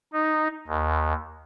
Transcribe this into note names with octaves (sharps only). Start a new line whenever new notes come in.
D#4
D#2